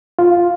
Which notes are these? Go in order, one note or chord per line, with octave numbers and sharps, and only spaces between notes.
F4